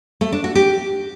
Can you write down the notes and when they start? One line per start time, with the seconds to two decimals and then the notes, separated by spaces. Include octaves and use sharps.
0.21 A3
0.32 D4
0.44 F#4
0.55 G4